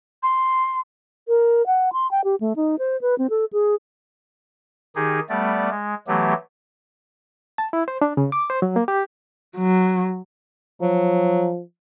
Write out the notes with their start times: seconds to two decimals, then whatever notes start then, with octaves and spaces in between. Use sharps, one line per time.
0.22 C6
1.28 A#4
1.66 F#5
1.93 C6
2.11 G5
2.24 G4
2.40 A3
2.56 D#4
2.79 C5
3.01 B4
3.18 C4
3.30 A4
3.53 G#4
4.96 D#3 D#4 G4 G#4
5.29 G3 A3 B3 D5
5.70 G#3
6.07 E3 F#3 A3 B3 G4
7.58 A5
7.73 E4
7.88 C5
8.02 D4
8.17 C#3
8.32 D6
8.50 C5
8.62 F#3
8.76 A#3
8.88 G4
9.57 F#3
10.82 F3 F#3